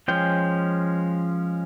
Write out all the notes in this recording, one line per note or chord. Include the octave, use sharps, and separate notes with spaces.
F3 G#3 C#4 G5